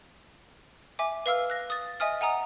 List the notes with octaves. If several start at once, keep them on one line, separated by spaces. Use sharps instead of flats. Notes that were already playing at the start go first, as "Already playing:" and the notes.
E5 G#5 D6
B4 F5 E6 F6
F#6 A#6
D#6 A6
D#5 E5 G#5 D#6 F6
F#5 G#5 A#5 D#6